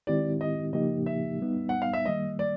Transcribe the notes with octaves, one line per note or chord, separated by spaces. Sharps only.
D#3 G#3 C4 E4 G4 D5
D#5
C#3 F3 A#3 D#4 G4 D#5
E5
G3 B3 D#4
F#5
F5
E5
D#3 G3 A#3 D#5
D5